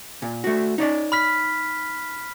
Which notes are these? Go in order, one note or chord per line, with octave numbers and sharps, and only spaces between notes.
A#2
A3 F#4
D#4 C#5 D5
B5 F6 B6